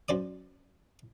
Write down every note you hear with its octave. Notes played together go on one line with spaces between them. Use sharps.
F#2 C5 D5 D#6